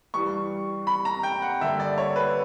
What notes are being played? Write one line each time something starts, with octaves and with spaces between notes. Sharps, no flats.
G2 E3 G3 C#6
B5
A#5
G5
F#5
G2 D3 A#3 E5
D5
C#5
B4